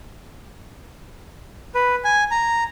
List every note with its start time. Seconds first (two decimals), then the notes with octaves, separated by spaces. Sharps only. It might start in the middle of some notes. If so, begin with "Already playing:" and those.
1.75 B4
2.04 G#5
2.31 A#5